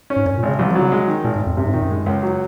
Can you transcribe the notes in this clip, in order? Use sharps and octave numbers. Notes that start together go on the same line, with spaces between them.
C#4
G#2
F#2 C#4
A#2
G#1
C#3
C2 F3
F3
F#3
C#3
G#3
D#3
G#1 A#2
G#2
G#1
F2
F#2 C3
G#2
A#2 D#3
F#2
G#3
C#2
F#3